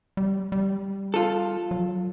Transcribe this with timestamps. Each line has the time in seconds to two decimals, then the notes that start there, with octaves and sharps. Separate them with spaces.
0.17 G3
0.52 G3
1.14 F4 A4
1.71 F#3